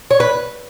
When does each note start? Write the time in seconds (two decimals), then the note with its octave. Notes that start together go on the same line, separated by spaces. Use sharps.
0.11 C#5
0.20 B4